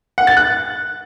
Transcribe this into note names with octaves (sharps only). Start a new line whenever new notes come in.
F#5
A6
F#6